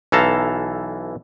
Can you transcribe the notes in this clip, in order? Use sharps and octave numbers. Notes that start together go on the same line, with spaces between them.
B1 E3 A4 F5 A5 A#5